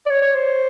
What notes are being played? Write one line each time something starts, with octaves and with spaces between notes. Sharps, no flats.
D5
C#5
C#5
C5